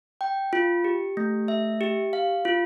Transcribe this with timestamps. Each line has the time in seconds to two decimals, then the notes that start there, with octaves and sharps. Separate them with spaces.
0.21 G5
0.53 F4
0.84 G4
1.17 A3
1.48 E5
1.81 G4
2.13 F5
2.45 F4